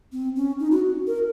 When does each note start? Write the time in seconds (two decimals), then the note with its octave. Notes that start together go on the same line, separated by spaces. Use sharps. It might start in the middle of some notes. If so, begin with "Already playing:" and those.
0.12 C4
0.36 C#4
0.60 D#4
0.71 F#4
1.07 A#4